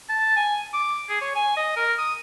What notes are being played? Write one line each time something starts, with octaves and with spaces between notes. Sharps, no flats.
A5
G#5
D6
G#4
C#5
G#5
D#5
A#4
D#6